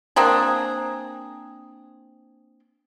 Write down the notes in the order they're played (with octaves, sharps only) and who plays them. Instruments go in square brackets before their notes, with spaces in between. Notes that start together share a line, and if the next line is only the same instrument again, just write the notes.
[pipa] A#3 C4 D4 G#4